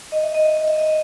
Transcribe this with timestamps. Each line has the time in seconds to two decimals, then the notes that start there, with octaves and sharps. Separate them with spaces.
0.12 D#5
0.23 E5
0.34 D#5
0.45 E5
0.57 D#5
0.68 E5
0.79 D#5